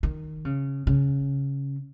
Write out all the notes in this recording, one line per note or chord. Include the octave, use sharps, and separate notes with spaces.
D#3
C#3
C#3